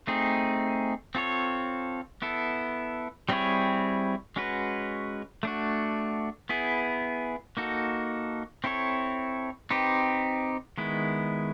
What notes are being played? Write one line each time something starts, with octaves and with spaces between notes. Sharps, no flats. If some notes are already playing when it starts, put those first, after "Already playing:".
A3 C4 D#4 G#4
C4 F4 A4 C#5
B3 E4 A4
G3 C4 E4 G#4 C#5
G#3 C#4 F#4 B4
A3 D4 F#4
B3 E4 G#4
A#3 D#4 F#4 A4
C4 E4 A4 C#5
C4 D#4 G4 B4
D#3 G#3 B3 E4